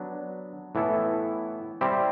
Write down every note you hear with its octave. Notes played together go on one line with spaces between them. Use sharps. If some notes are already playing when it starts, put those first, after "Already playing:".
Already playing: F#3 B3 D4
A2 E3 B3 E4 A4
G3 C4 E4 G4 C5